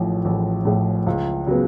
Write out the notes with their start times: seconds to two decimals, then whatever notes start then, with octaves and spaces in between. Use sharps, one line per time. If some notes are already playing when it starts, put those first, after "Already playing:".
Already playing: A1 A2 F3
0.25 A1
0.65 A2 F3
1.07 C#2
1.47 C#3 F#3 B3